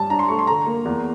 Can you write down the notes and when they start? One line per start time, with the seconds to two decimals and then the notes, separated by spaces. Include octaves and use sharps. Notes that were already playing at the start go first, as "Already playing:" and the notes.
Already playing: G2 A5
0.10 D4 A#5
0.19 C6
0.29 A3 C#6
0.39 C6
0.47 D3 A#5
0.67 A#3
0.85 E2